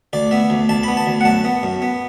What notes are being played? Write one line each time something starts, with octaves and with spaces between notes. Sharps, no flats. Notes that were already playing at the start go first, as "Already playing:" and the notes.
D2 D5
B3 E5
D2
D2 A5
B3 B5
A5
D2
F#5
F#2 A5
B3
F#2
B3